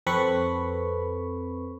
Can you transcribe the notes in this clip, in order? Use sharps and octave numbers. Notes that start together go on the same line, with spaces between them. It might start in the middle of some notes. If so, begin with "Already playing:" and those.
F2 C4 A4 B4 B5 C#6